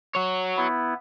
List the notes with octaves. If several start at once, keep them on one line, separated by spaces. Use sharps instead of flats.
F#4 C#5
B3 E4